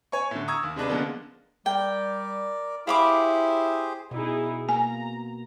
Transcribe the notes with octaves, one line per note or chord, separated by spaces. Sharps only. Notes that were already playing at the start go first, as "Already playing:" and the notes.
C#5 G#5 C#6
A2 D3
A#5 C#6 D#6 E6 G#6
D#2
C3 G#3 D4 B4
D3 F3 G#3 A#3 B3 C#4
G3 A#4 D5 G5
E4 G4 G#4 C5 F5 B5 D6
B2 D#4 E4 G#4
A#3 G#5 A#5